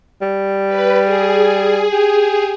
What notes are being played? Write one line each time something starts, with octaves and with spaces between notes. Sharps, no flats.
G3
B4
G#4
G4